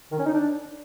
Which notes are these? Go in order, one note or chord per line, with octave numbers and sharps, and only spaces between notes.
D#3
C#4
D#4
D4